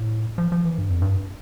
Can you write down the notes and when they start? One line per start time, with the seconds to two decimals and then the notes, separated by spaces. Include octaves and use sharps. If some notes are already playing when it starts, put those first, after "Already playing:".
Already playing: A2
0.38 F3
0.52 F3
0.64 E3
0.78 G2
0.89 F2
1.02 G2